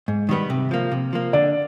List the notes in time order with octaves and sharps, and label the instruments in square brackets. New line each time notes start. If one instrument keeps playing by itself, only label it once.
[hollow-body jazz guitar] G#2
D#3 G3 B3
C3
F3 A#3
C3
F3 A#3
[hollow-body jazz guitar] D3 [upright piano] D5